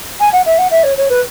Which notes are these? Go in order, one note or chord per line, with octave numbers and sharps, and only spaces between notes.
G#5
F#5
E5
F#5
E5
C#5
C#5
B4